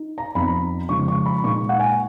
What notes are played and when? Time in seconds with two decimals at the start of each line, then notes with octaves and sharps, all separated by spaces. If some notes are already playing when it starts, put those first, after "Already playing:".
Already playing: D#4
0.18 A#5
0.35 F2 F3 B3 D#4 B5
0.89 C#3 F3 G#3 C#6
1.08 C#6
1.26 B5
1.44 A#2 G#3 D#4 C#6
1.69 F#5
1.80 G#5